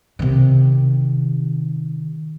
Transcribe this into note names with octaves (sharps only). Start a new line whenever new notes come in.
C3 D#3